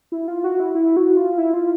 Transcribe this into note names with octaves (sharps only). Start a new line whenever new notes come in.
E4
F4
F#4
E4
E4
F#4
F4
E4
F4